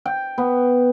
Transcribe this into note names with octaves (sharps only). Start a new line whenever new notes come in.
G5
B3